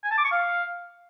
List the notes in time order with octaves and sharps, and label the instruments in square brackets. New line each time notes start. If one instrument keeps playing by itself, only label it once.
[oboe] G#5
A5
D6
C#6
F5